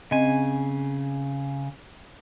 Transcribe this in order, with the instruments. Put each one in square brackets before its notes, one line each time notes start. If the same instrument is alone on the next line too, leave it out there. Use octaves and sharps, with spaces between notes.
[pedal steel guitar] C#3 G#5 [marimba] C4 D#5